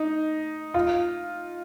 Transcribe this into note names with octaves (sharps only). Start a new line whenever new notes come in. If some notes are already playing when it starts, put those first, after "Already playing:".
Already playing: D#4
F4